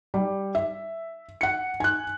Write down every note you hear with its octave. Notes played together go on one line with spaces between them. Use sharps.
G3
E5
F#5 C#7
G#5 F#6